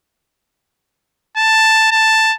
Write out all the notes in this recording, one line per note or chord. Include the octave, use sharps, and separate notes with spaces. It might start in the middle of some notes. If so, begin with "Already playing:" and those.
A5
A5